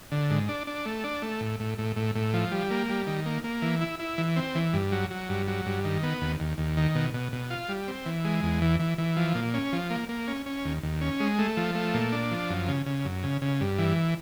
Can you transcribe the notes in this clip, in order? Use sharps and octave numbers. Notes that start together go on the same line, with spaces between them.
D3
G#2
D4
D4
A3
D4
A3
A2
A2
A2
A2
A2
F3
G3
A#3
G3
D#3
A#3
A#3
E3
E4
E4
E3
C4
E3
G2
F#3
F#3
G2
F#3
G2
D#3
B3
D#2
D#2
D#2
D#3
B2
B2
B2
F4
G3
C4
E3
G#3
E2
E3
E3
E3
F3
A#2
C#4
F3
A#3
A#3
C#4
C#4
D#2
D#2
C#4
G#3
A3
F3
A3
A#2
D4
F3
F#2
C#3
C#3
F#2
C#3
C#3
G2
E3